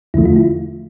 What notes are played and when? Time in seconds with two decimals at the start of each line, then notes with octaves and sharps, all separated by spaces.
0.14 E2 D3 F3 A3 E4
0.25 F4
0.36 E4